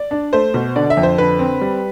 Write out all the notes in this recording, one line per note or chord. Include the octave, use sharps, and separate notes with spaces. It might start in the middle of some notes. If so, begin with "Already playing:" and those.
Already playing: D5
D4
A3 C5
B2
D3 D5
E5
F2
C5
D3 B4
C4
G3